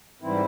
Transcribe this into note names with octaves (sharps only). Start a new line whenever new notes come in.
G#2 E3 G3 C4 E4